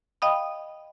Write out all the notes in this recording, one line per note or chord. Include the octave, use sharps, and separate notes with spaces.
D#5 F5 G5 B5 D#6